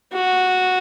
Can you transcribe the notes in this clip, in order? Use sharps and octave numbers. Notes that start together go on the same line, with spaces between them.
F#4